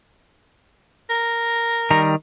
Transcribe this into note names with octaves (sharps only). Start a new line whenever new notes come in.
A#4
D#3 G3 A#5